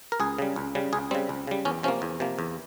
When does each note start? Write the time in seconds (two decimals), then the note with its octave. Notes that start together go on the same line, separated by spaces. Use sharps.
0.12 A#4
0.20 C#2 G#4
0.38 C#3 G3
0.56 C#2
0.75 C#3 G3
0.93 C#2 G#4
1.11 C#3 G3 C4
1.29 C#2
1.47 C#3 G3
1.65 E2 C#4
1.83 C3 F3 A#3 C#4
2.02 E2
2.20 C3 F3 A#3
2.39 E2